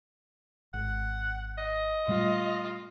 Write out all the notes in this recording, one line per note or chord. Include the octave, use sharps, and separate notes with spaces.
G#1 F#5
D#5
A#2 G3 A3 F4